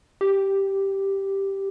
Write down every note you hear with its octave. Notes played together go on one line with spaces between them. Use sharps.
G4